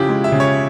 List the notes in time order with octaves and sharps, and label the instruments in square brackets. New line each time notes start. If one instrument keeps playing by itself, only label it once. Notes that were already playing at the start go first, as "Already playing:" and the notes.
Already playing: [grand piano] C#3 F3 E4 G4
G#3
E5
C#3
C#5